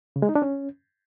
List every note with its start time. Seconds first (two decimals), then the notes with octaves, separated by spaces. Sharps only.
0.16 C#3
0.22 G#3
0.29 D#4
0.35 D4
0.42 C#4